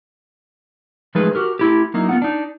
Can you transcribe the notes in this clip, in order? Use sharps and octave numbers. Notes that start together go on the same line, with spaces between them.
F3 G#3 A3 D#4 G#4 B4
F#4 G4 A#4
A3 E4 G4
F#3 A#3 D#4 E4
B3 F4 F#5
D4 D#4